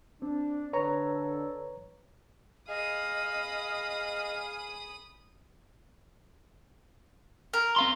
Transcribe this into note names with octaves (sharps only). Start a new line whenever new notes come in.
C4 D4
D3 A4 B4 C#5 A#5
G#4 D#5 F5 B5 D#6
A#4
C4 F5 C6